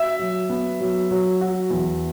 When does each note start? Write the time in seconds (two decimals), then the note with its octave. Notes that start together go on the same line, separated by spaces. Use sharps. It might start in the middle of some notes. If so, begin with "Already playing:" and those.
Already playing: F#4 E5
0.19 F#3
0.50 B3
0.80 F#3
1.11 F#3
1.41 F#4
1.70 E2